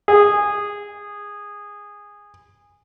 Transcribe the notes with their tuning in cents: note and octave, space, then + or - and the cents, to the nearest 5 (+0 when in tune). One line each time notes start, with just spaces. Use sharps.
G#4 -15